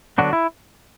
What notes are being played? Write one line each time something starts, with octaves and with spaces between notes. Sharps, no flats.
D3 F#3 B3 D4 F#4
E4